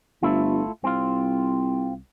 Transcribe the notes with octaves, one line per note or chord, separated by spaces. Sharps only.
G1 A3 E4 F4
C2 C4 F4